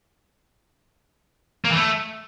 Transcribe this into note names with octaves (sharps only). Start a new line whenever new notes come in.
A#3
E3
A3